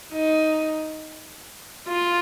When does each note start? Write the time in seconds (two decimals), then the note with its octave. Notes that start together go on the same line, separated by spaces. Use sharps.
0.13 D#4
1.88 F4